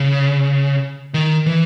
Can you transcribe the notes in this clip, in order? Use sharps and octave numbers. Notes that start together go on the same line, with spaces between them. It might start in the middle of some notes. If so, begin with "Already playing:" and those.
Already playing: C#3
D#3
E3